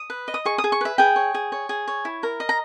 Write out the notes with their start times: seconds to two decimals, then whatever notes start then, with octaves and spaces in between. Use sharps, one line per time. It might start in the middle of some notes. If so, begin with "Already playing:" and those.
Already playing: D#6
0.10 B4
0.28 D#5
0.34 D#6
0.45 G#4 C#6
0.58 D#6
0.64 G#4
0.72 C#6
0.81 B4 E5
0.98 G#4 G5
1.16 C#5
1.34 G#4
1.52 C#5
1.69 G#4
1.88 C#5
2.05 E4
2.23 A#4
2.40 D#5
2.49 A#5